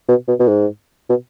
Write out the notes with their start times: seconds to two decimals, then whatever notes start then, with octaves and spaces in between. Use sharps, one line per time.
0.08 B2
0.28 B2
0.39 B2
0.48 G#2
1.09 B2